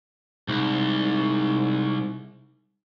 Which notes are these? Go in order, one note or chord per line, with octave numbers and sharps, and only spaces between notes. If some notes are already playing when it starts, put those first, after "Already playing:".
C2 G#2